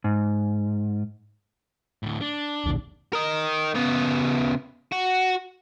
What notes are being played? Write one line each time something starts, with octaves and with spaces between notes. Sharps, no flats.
G#2
D2 A2
D4
D#1 B1 D#3
A#4 D#5
C#3 B3
F#4